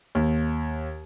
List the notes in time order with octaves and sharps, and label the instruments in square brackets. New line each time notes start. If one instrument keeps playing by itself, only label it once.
[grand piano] D#2